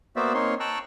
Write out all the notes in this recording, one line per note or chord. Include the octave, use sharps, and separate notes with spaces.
A#3 B3 F#4 C5 D5 E5
A#3 C4 D#4 C#5 C6
G5 A5 A#5 C#6 E6 F#6